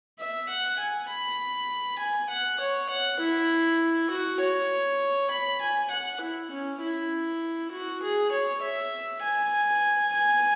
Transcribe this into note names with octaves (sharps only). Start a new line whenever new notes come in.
E5
F#5
G#5
B5
G#5
F#5
C#5
F#5
E4
F#4
C#5
B5
G#5
F#5
E4
C#4
E4
F#4
G#4
C#5
E5
G#5
G#5